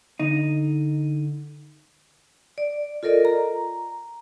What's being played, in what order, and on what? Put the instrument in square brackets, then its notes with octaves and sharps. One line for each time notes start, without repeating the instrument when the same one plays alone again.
[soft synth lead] D3 [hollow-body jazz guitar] D#4
[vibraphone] D5
F4 A4 A#4 D5 D#5
A#5